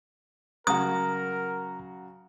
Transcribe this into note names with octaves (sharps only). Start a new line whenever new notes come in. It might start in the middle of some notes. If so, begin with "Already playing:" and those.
C#3 F#3 F#4 A#4 A#5 D#6